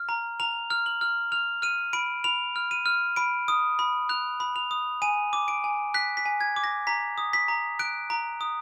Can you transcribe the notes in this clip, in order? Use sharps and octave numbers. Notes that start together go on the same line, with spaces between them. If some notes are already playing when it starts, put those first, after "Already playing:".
Already playing: F6
A#5
A#5 F7
F6
F#7
F6
F6 F7
F6 D#7
B5 D7
B5 F7
F6
D#7
F6
B5 D7
D#6
B5
F#6 F7
B5
F7
D#6
G#5 D#7
D6
D7
G#5
F#6 B6
B6
G#5
G#6
D6
A#6
A#5 B6
D#6
B6
A#5
F#6 D7
A#5
D#6